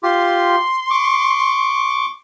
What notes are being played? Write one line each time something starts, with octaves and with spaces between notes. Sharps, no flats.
F4 G4 C6
C#6 D6